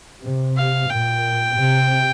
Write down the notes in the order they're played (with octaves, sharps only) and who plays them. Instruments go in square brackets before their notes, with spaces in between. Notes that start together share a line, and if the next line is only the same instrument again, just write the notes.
[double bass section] C3
[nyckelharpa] F5
[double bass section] A#2 [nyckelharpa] G5
[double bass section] C3